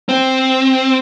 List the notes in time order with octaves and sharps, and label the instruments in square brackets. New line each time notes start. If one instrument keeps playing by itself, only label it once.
[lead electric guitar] C4